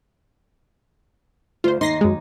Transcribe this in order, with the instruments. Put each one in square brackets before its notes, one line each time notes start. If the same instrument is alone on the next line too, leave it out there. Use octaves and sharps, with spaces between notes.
[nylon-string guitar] D2 [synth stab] F4 C5
[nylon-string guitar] D#2 D#4 [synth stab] C6 A#6 C7
[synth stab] F#2 G#3